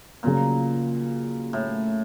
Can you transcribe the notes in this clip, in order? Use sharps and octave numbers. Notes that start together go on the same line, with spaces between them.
A#2 C#3 F#3 A#3
A2